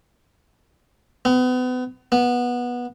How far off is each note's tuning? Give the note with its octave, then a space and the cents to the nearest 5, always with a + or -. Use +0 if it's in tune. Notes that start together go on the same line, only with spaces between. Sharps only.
B3 +35
B3 -15